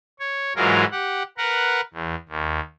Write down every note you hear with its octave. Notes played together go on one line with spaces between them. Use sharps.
C#5
G#2 E3 F#3 G#3 F4 A#4
G4 F#5
A#4 B4 F#5
E2
D#2